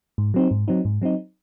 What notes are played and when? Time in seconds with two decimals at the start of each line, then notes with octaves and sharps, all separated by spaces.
0.18 G#2
0.34 F#3 C4 D#4
0.51 G#2
0.68 F#3 C4 D#4
0.85 G#2
1.02 F#3 C4 D#4